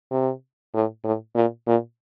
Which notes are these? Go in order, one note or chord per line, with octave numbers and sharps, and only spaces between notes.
C3
A2
A2
A#2
A#2